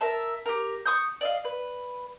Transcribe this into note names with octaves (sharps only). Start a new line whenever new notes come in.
A#4 E5 A5
G4 A#4
C#6 D#6 G6
D5 D#5 F5
B4